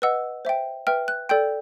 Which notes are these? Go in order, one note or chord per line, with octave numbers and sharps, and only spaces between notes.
B4 D#5 F#5 E6
C5 E5 G5
B4 E5 G5 F6
F#6
A4 D5 G5 G6